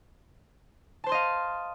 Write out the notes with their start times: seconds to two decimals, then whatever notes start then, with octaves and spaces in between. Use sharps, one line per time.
1.04 A5
1.06 C5
1.09 C6
1.12 D#5
1.14 F5